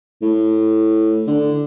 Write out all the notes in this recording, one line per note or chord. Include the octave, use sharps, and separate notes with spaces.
A2
D3